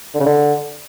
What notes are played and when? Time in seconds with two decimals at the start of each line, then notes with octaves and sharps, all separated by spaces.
0.14 D3
0.20 C#3
0.26 D3